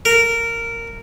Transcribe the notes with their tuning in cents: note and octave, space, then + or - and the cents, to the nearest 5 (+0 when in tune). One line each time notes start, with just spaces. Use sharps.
A#4 -10